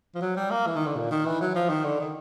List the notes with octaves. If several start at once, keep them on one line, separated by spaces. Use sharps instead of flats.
F3
F#3
G3
A#3
E3
D#3
D3
A#2
D#3
E3
F#3
F3
D#3
D3
D#3